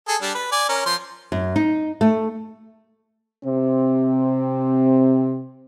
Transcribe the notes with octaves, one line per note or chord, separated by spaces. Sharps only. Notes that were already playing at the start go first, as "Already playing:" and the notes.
G#4 A4
G3 D4
B4
D5 G#5
C#4 A#4
F3 C6
F#2
D#4
A3
C3 C4